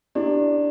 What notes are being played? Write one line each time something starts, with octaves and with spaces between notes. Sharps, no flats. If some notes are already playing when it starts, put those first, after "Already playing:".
D4 E4 G4 D5